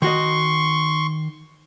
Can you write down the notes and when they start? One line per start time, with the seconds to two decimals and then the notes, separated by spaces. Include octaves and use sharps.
0.02 D#3 F#4 D#5 C6 C#6